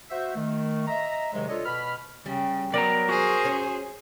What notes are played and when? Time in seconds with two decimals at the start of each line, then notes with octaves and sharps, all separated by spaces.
0.10 F#4 C5 E5
0.35 D#3 A3
0.87 D#5 E5 A#5
1.33 G#2 C3 D#3 F#3 G#3
1.48 D4 F4 A4 C#5 D#5
1.65 B2 B5 F6
2.26 C#3 G3
2.74 F#3 B3 A#4 D5 G5 A#5
3.09 F#4 G#4 C5
3.45 C#4